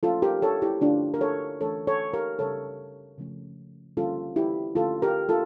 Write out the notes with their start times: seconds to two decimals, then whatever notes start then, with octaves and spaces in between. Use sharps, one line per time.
0.03 F3 A3 C#4 F4 A4
0.22 G4 A#4
0.42 A4 C#5
0.62 E4 G4
0.81 D3 A3 C#4 D4 F4
1.14 A#4
1.21 A4 C#5
1.60 E3 A3 C#4 A4 C#5
1.87 A4 C#5
2.14 G4 A#4
2.39 C#3 G3 C#4 A4 C#5
3.18 C#3 F3 A3 C#4
3.97 D3 G3 A#3 C#4 F4 A4
4.36 E4 G4
4.76 D3 A3 C#4 F4 A4
5.02 G4 A#4
5.29 F4 A4